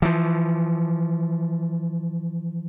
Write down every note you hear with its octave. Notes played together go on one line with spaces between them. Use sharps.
E3 F3